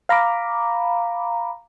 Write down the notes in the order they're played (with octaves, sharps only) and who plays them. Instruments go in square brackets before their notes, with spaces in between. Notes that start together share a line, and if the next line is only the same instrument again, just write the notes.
[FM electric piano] F5 A#5 B5 D6